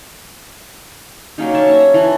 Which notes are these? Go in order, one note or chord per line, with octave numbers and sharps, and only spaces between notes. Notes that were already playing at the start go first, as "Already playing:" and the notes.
F#3 A#3 C#4 D#4
C#5 E5 A5
E5 A#5
E3 A5